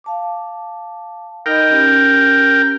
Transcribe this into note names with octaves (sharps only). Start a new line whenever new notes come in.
F5 A5 D6
D#4 A#4 D#5 G5 B5
C#4 G4